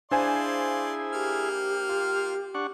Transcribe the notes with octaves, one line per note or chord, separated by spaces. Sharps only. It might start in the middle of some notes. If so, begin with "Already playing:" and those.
D4 E4 G#4 C5 D5 F5 G#5 C6
A#3 G4 F6
F4
D4 F#5 C#6